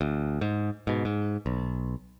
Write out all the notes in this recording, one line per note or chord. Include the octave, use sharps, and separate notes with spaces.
D2
G#2
G#2 B2
G#2
B1